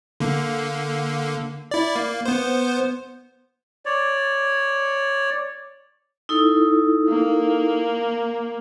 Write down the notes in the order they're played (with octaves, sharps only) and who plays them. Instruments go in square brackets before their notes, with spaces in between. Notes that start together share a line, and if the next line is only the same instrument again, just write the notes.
[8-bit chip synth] D3 A#3
E4 D5
A#3
B3 C5
[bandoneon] C#5 D5
[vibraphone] D#4 E4 A4
[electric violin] A#3